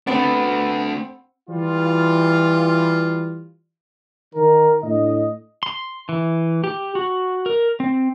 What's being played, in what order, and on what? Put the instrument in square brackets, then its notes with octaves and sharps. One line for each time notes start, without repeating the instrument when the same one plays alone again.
[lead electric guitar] A3 D4 [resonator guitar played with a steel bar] B3 [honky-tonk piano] C4
[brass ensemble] E3 G3 F4
D#3 A#4
A2 D4 D#5
[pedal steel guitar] C6
E3
G4
F#4
A#4
C4